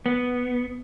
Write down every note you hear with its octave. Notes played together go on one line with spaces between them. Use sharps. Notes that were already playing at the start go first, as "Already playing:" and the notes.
B3